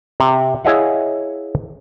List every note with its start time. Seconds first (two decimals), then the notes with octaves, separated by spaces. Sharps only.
0.20 C3
0.65 E4 G#4 C#5 D#5 F5 F#5